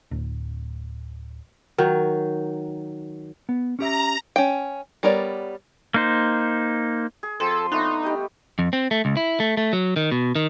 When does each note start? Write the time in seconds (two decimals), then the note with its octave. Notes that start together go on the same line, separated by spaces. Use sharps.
0.11 D1
1.78 D#3 F#3
3.49 B3
3.79 C#4 G4 E5 A#5
4.36 C#4 G5
5.03 G3 B3 A#4 C#5 D5
5.94 A#3 D#4 C5
7.23 G#4
7.40 F3 C4 A4 A5 C6
7.72 A3 B3 D4 D#4
8.03 G3 G4 D#5
8.59 F2
8.73 C4
8.91 A3
9.05 C#2
9.17 E4
9.40 A3
9.57 A3
9.73 F#3
9.96 D#3
10.11 B2
10.35 D#3